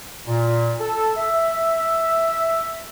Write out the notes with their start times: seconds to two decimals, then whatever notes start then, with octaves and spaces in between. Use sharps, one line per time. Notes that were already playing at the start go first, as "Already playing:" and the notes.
0.28 A#2
0.80 A4
1.17 E5